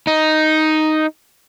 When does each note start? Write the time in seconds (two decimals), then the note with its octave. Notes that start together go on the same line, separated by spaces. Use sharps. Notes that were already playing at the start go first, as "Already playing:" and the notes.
0.07 D#4